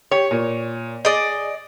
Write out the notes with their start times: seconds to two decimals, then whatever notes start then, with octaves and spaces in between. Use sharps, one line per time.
0.11 G4 C#5
0.31 A#2
1.05 G#4 D5 D#5